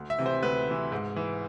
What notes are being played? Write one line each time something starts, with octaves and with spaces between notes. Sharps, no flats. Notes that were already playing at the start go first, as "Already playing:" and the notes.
Already playing: D2
E5
C3 E3
C5
D2 B4
C3 E3
G#2
E3